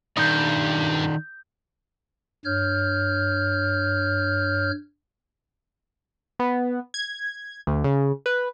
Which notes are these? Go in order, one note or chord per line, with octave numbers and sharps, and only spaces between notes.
G2 D#3 D#4 D5 D#6 G6
G2 C#5 F6 G6
B3
G#6
D2
C#3
B4